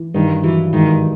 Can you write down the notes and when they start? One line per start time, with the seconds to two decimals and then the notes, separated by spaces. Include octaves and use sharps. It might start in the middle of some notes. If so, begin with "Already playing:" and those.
Already playing: E3
0.14 G2 D#3
0.43 E3 F#3
0.73 G#2 D#3